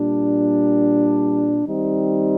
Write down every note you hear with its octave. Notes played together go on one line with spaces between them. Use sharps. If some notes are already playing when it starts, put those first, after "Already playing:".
Already playing: A#2 G3 D4
D#3 G3 C4 D#4